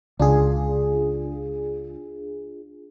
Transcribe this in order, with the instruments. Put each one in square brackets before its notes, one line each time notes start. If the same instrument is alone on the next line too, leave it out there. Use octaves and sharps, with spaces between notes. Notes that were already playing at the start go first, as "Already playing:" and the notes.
[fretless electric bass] C#2 [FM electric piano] D4 F4 G#4